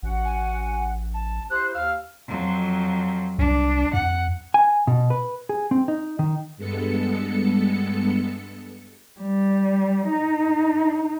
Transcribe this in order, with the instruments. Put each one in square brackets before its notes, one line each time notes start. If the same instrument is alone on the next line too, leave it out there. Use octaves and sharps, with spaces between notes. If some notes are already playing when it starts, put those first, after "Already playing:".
[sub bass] A1 [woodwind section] C#4 F#4 F#5
[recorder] G#5
A5
[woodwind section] E4 G4 C5 [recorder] F#6
[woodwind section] D#2 E6 F6 [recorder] F5
[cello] F2 F#3
[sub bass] C2 [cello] D4
[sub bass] F2 [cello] F#5
[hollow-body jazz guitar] G#5
B2
B4
G#4
C4
D#4
D#3
[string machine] G2 G#3 B3 A4 C#7
[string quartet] G3
D#4